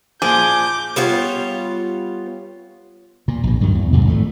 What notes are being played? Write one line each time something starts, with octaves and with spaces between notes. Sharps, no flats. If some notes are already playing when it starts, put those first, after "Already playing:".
A#2 F3 G#4 D6 G6
G3 B3 F4 C#5
A#2
A#1 B2
D2 G2 D3 D#3
E2
F2 G#2 C3 F3
G#1 F3 A3